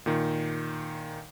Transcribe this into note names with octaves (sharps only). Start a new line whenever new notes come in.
A#2 D#3